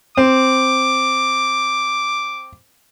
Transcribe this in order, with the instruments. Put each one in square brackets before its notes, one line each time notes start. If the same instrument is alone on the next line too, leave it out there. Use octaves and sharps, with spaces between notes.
[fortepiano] C4 [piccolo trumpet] D6